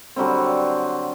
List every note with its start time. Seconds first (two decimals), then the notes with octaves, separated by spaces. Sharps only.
0.16 D3 F#3 G3 C4